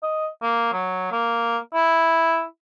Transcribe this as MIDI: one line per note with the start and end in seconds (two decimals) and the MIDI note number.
0.03 0.28 75
0.42 0.72 58
0.73 1.10 54
1.12 1.58 58
1.74 2.44 64